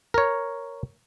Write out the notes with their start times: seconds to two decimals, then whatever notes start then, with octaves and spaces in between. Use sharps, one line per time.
0.14 A#4 C#5